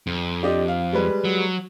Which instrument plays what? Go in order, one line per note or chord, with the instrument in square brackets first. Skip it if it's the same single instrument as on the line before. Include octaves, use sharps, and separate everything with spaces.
[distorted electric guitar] F2
[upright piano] D4 G4 D#5
F5
G3 G#3 B4
[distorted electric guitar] F#3